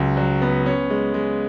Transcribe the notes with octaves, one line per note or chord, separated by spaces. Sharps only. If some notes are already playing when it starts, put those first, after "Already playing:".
Already playing: C#2 F#3
F#3
B3
C#4
G#3
G#3